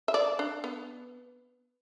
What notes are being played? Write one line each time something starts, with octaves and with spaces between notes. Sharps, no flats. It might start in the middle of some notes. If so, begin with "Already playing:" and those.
E5
D5
D4
B3